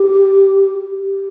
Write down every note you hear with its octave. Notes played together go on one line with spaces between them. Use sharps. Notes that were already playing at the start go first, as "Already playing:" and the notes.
Already playing: G4
G4